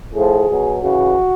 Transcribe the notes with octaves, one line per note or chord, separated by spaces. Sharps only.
A2 F3 G#4
B2 F#3
C#3 E3 F#4